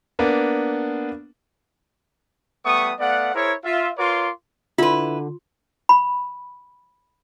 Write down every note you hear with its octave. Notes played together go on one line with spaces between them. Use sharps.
A#3 B3 D4
G3 A3 B3 C#6 D#6
A3 B3 D5 F5 F#5
E4 G#4 A#4 C5 C#5
F4 E5
F4 A#4 B4 C#5 C6 D6
D3 E4 F4 B4 C6
B5